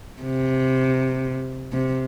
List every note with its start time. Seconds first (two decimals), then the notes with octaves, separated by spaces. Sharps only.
0.22 C3
1.73 C3